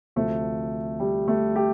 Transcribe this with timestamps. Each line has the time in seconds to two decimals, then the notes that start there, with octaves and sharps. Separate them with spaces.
0.16 D2 C3 F3 A3
1.00 G3
1.28 A3
1.56 G4